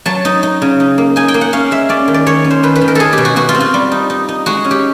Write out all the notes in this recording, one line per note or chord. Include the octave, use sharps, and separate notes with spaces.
F#3 A5
D#4
D#4
C#3
D#4
A#3
D#4 G#5
G5
A#3
F#5
C#4 F5
G#3 E5
C#4 D5
D#3
D5
D#3 C#5
C#4
C5
D#3 B4
B4
D#3
A#4
D#4 G#4 A4
G4
B2
F#4
B2 F#4
F4
C4
F4
G3
D#4
D#4
D#4
G#3 F#4
C#4
G4